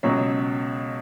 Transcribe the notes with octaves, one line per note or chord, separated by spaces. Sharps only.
C#2 B2 F#3 C#5